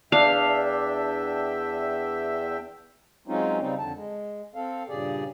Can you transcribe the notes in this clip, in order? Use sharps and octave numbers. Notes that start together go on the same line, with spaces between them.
E2 D4 E5 F5 G5
F#3 G#3 C4 C#4 D#4 F4
C#3 G3 C4 D#4
F2 D3 A5
G#3
C4 A4 F5
G2 A#2 C#3 G4 G#4 D5